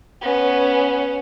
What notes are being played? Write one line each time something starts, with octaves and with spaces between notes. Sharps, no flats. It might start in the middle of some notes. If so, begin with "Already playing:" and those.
B3 C#4